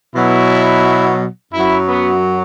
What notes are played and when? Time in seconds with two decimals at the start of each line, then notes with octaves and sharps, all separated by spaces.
0.15 B2 F#3 E4
1.53 F#2 F#3 E4
1.88 B3